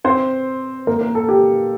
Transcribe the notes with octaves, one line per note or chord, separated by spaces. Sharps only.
C4 C5
A#3 A#4
A#3 A#4
A4
G4